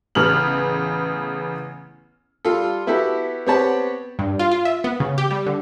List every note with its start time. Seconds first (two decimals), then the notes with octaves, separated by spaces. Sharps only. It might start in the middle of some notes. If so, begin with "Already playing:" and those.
0.15 A1 C#3 B3 F6 F#7
2.45 G3 F4 A4
2.87 B3 E4 F#4 G4 A4
3.46 B3 C4 G4 C#5 F#5 A5
4.19 G2
4.39 F4
4.52 F4
4.65 E5
4.84 B3
5.00 C#3
5.18 G4
5.31 G3
5.47 D3